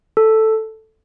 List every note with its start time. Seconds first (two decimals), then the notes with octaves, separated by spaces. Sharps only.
0.17 A4